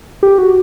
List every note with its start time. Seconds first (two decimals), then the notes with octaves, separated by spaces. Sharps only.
0.23 G4
0.38 F#4